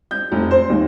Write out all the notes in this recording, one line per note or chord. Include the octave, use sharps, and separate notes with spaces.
G6
F1
C5
D#2